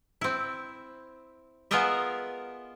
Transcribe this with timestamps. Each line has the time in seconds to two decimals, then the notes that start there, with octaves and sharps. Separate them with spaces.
0.21 C4 E4
1.71 B3 F4 G#4 A#4 D#5 E5